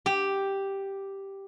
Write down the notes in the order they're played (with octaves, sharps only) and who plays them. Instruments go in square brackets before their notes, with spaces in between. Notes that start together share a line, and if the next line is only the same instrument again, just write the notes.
[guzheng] G4